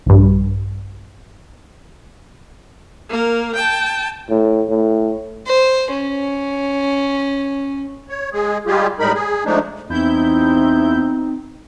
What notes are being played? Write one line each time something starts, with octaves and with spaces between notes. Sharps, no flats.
A#1 G2
A#3 A#4
G5 A5
A2
A2
C5
C#4
C#5
G#3 G#4
G3 G#3 F4 G4 G#4
A2 G3 G#3 D#4 A#4 B5
G#4
F3 G#3 A3 D4 D#4
E2 C4 D#4 E4 G6